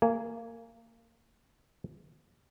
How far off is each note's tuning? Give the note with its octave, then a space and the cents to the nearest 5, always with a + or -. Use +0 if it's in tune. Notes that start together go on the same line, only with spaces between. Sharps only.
A#3 -25 G#5 +0